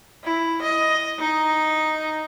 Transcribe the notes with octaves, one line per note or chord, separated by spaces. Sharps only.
E4
D#5
D#4